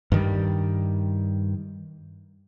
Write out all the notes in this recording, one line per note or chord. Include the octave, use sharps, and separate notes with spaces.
G2 D#3 G3